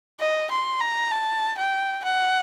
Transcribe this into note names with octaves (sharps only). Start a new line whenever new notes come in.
D#5
C6
A#5
A5
G5
F#5